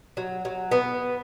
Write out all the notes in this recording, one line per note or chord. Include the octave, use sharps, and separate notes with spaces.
F#3
F#3
B3